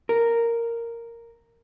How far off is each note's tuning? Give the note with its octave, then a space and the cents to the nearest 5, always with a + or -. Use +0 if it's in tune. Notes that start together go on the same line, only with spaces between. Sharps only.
A#4 -5